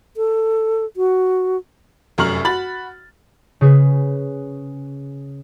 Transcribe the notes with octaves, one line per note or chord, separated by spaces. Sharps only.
A4
F#4
F1 F#2 A#5 C#6 F6 F#7
F#4 B5 A6 F#7
C#3 G#4 B4